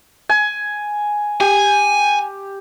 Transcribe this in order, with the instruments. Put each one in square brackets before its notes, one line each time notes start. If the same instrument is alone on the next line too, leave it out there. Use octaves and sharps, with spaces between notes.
[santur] G#5
[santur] G4 [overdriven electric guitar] G#5